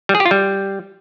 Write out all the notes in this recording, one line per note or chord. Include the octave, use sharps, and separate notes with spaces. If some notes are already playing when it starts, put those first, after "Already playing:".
G3
G#4
G4
F4
G3